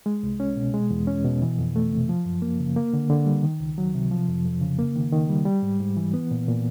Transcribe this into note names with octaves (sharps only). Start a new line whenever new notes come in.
G#3
C2
C#4
B2
G#3
E2
C#4
B2
E3
F2
A3
C3
F3
F#2
A#3
C#3
A#3
D3
D3
G3
D#3
C#2
F#3
C3
F3
F2
F2
C#3
A#3
D#3
D#3
G3
G3
G#2
G#2
E3
B3
A#2
A#2